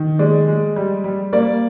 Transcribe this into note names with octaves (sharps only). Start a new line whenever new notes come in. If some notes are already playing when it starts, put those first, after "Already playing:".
Already playing: D#3
G#3 D5
G#3
G3
G3
A#3 D5